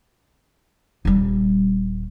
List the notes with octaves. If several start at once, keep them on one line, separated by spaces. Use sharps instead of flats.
D#1 G3